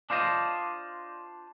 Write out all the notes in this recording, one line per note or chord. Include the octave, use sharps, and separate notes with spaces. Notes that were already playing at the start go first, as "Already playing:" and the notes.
D4 F4 C5 D#5